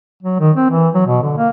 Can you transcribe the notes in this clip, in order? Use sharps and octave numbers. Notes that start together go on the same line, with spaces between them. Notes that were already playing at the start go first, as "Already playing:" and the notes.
F#3
D#3
C4
E3
F#3
B2
D3
A#3